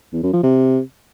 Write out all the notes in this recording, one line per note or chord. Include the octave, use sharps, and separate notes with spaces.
E2
F#2
F3
C3